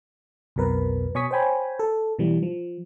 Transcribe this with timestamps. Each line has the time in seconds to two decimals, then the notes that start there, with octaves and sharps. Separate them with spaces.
0.56 B1 F2 B2 A#4 B4
1.15 B2 C#5 G#5 C#6 D#6 B6
1.31 C5 C#5 G5 G#5 B5
1.79 A4
2.19 B2 E3 G3
2.43 F3